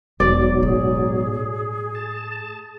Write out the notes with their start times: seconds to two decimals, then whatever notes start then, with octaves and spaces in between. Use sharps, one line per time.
0.20 E1 G#2 B2 F#3 D5
0.63 A2 G#4
1.95 A5